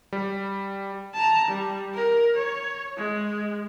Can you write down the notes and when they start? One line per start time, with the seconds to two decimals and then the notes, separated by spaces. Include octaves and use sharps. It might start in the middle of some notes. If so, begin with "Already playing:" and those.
0.13 G3
1.14 A5 A#5
1.48 G3
1.94 A#4
2.36 C#5
2.97 G#3